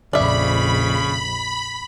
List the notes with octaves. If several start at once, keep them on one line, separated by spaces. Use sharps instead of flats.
A#1 F2 C#3 D5 E5 B5